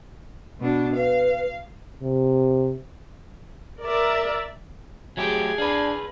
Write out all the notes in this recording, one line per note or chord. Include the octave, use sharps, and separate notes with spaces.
B2 D4
B4 F5
C3
A#4 D5 E5
F#3 A3 G4 G#4 G5 G#5
D4 G#4 B4 F5